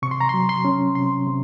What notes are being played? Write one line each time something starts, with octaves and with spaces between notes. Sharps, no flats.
C3 C#6
C6
A#5
F#3 C6
C6
C#4
C3 C6
C3